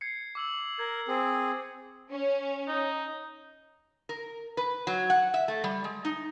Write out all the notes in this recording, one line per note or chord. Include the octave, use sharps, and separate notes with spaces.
G#6 C7 C#7
D6 E6 F#7
A#4 G#6
C4 G#4
C#4
D#4
A#4
B4
F#3
F#5
E5
A3
G3
G#3
D#4